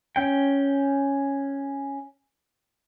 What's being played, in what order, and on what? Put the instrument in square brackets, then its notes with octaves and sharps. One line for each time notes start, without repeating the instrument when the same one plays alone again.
[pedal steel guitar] C#4 G5